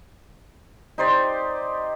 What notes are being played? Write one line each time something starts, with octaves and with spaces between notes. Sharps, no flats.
D#4 G4 C5 D5